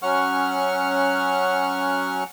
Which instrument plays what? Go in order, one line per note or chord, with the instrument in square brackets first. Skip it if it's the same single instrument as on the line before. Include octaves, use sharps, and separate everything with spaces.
[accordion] F#3 C#4 F#5 C#6 F6